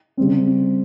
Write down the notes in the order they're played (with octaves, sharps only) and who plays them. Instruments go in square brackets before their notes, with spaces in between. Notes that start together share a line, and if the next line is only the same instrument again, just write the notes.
[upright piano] C#3 G3 C4